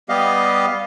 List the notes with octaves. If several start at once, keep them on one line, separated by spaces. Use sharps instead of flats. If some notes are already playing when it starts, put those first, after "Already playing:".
G3 B3 G4 D#5 F5